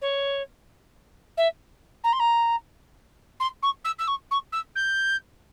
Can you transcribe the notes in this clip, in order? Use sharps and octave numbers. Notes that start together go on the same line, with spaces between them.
C#5
E5
A#5
C6
A#5
C6
C#6
E6
E6
C#6
C#6
E6
G6